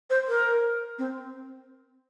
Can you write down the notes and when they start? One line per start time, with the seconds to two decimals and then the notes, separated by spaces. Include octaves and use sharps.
0.10 C5
0.28 A#4
0.99 C4